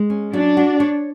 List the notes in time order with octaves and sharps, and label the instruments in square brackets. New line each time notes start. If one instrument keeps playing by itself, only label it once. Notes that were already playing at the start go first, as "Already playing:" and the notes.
Already playing: [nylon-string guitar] G#3
C#4
[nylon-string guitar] F#3 [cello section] D4
[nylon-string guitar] F#4
C#5